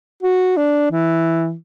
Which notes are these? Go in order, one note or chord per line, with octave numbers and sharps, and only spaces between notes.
F#4
D4
E3